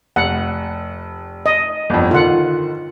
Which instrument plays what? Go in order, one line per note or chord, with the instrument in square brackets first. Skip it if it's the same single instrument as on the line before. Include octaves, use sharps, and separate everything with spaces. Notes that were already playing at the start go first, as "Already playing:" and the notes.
[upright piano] F1 [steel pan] F#5
[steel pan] D#5
[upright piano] G1 F2
[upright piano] D3 D#3 [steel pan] F4 F#5